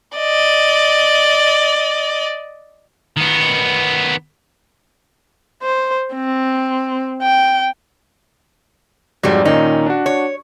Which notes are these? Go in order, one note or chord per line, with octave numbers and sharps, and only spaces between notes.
D5 D#5
D#3 B3
C5
C4
G5
F2 G#2 F#3 G3
A#2 D#3 C#4 D#4
D4 F#4
C#5